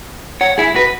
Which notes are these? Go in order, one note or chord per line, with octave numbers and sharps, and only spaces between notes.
C#5 F#5
E4 G#4
F#4 B4